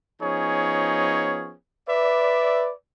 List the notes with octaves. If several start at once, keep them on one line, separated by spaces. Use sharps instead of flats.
F3 B3 C#4 D#4 G#4 C#5
B4 D5 E5